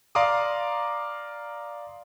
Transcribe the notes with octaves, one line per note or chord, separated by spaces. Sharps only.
D5 F5 A#5 C6 D6 D#6